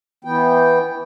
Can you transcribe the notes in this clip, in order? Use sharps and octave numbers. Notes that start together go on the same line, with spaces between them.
E3 B3 G5